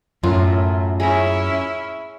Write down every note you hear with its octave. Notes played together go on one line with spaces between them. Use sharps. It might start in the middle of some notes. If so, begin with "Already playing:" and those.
F#2 A2 F4
C#4 E4 G#4 A#5